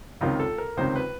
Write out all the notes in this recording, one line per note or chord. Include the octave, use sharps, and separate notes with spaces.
C#2 C3 D#3 F4
A4
A#4
C#2 C3 D#3 C5
B4